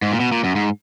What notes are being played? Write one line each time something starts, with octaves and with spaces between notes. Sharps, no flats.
G#2
A#2
B2
A#2
F#2
G#2